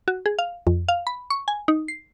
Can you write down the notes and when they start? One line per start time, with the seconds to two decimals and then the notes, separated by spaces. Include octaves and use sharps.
0.08 F#4
0.26 G#4
0.39 F5
0.67 F2
0.88 F5
1.07 B5
1.30 C#6
1.48 G#5
1.68 D#4
1.88 C7